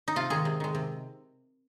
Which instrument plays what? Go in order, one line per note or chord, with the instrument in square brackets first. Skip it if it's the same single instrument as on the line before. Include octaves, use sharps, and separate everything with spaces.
[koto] D#4
C3 F4
D#3 G#3 G#4
C3
D#3 G#3
C3